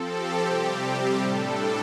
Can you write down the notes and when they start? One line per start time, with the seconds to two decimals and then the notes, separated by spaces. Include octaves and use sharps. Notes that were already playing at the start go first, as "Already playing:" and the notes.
Already playing: F3 C4 A4
0.08 G4
0.46 C3 G3 C4
1.18 A2 G3 D4 A4